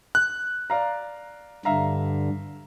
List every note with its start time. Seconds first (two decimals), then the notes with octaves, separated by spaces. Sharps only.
0.15 F#6
0.70 D5 F5 A#5
1.65 G2 D3 E5 F5 A#5